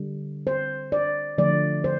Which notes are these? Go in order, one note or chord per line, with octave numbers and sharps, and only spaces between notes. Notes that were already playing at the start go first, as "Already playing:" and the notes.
Already playing: D3 G3
C5
D5
D3 F3 A3 D5
C5